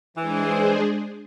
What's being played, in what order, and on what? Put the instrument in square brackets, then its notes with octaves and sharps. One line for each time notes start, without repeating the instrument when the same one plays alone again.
[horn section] E3 [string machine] G#3 D4 G#4 C5